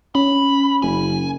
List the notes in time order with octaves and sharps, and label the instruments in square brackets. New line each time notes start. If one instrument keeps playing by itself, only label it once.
[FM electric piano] C#4 [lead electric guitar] B5
[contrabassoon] F#1 [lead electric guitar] G#5